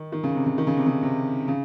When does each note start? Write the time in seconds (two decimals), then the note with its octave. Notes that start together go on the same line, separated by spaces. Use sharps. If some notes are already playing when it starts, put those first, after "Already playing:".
Already playing: D#3
0.12 D#3
0.24 C#3
0.35 C3
0.46 C#3
0.58 D#3
0.67 C#3
0.77 C3
0.87 C#3
1.03 C3
1.48 C#3